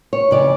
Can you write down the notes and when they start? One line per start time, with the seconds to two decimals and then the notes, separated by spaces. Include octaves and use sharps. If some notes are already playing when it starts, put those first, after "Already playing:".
0.13 C#5
0.31 F2 C#3 E3 D5